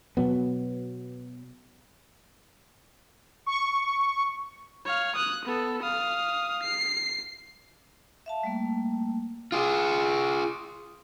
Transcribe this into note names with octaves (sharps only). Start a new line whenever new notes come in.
B2 F#3 B3
C#6
C#5 F5
D#6 F#6
B3 A4
F5 D#6
C7
E5 F5 A5
G3 A3 A#3
F4 G#4 C6 D#6